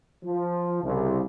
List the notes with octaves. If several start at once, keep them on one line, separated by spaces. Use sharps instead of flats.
F3
C2 C#3